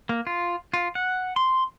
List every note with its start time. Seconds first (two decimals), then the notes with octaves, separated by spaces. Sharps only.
0.09 A#3
0.27 F4
0.74 F4
0.95 F#5
1.36 C6